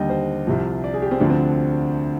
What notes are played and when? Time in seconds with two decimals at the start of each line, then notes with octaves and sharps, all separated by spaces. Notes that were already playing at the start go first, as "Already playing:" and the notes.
Already playing: D#2 D3 G3 D#5 G5
0.10 C5
0.47 C2 C3 F3
0.84 D5
0.94 G#4
1.02 G4
1.11 C4
1.20 D2 D3 F3 D4
1.30 C4